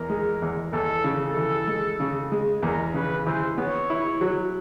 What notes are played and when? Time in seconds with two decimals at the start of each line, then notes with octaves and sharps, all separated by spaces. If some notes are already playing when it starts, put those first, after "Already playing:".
Already playing: E2 A#4
0.10 G#3
0.42 E2
0.73 E2 A4
1.04 C#3
1.20 A4
1.36 E3
1.67 G#3
2.00 C#3
2.32 G#3
2.62 E2 A#4
2.94 C#3 B4
3.26 E3 C5
3.57 B3 C#5
3.90 E4
4.21 F#3